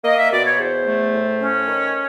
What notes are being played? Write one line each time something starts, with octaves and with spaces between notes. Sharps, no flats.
A#3 D#5
E5
B2 D5
C#5
E2 C5
A3
A2
C#4
D#3 C#5